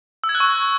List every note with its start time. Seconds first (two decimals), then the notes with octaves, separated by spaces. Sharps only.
0.24 E6
0.29 G#6
0.35 F#6
0.40 C#6